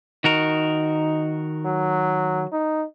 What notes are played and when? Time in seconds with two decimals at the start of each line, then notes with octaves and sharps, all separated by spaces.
0.24 D#3 D#4 F#4 A#4
1.65 F#3
2.52 D#4